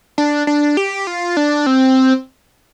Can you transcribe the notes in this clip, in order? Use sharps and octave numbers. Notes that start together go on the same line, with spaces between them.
D4
D4
G4
F4
D4
C4